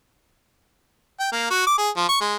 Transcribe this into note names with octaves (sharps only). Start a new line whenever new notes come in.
G5
A#3
F#4
D6
G#4
F3
C#6
G#3